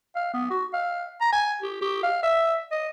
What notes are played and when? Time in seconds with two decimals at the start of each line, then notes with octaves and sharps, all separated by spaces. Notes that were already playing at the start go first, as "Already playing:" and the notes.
0.15 F5
0.33 B3
0.50 F#4
0.73 F5
1.21 A#5
1.33 G#5
1.61 G4
1.81 G4
2.03 F5
2.23 E5
2.72 D#5